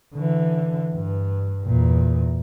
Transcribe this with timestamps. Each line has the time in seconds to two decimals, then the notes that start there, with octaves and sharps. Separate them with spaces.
0.15 D3 E3
0.94 G2
1.64 E2 A#2